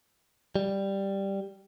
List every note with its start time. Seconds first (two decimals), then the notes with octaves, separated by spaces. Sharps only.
0.56 G3